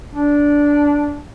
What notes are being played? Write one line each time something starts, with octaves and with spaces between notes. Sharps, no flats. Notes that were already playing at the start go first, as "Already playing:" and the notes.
D4